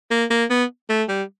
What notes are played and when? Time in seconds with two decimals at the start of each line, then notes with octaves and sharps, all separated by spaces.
0.11 A#3
0.30 A#3
0.50 B3
0.89 A3
1.09 G3